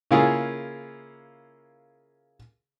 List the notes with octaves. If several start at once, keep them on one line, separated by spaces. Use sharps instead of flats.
C#3 A#3 E4 F4 G#4